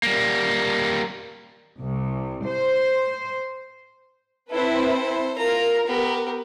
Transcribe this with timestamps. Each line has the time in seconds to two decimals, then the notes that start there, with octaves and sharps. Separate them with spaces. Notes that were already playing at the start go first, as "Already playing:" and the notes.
0.03 G3 A#3
1.80 C2
2.46 C5
4.51 C4 E4 A4 B4 C5
5.38 F4 A#4 A#5
5.87 B3 G4